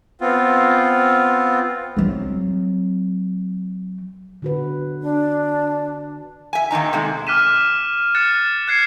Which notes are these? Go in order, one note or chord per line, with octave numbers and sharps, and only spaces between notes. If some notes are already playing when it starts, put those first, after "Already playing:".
B3 C4 F4
F#3 C4
D3 F#4 B4
D4
E5 G#5
A#2 D#3 D#4 A#5
C3 G#3 A3
D6 F6 F#6 B6 D#7 E7
F#6 A6 C#7 E7
F#6 G#6 C7 C#7